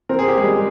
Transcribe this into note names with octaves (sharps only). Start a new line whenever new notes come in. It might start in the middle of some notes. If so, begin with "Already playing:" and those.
C4 A#4
G#4
G4
G#3 G#4
G3